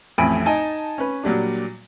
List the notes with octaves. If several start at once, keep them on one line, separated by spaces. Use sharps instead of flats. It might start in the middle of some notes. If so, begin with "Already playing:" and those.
A1 F2 A2 G#5 B5 D7
D#4 G#5 A5
C#4 B4
A#2 F#3 G3 D4